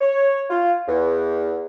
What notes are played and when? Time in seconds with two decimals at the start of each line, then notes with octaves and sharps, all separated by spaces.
0.01 C#5
0.50 F4
0.88 E2